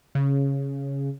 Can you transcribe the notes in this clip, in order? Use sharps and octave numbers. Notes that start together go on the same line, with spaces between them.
C#3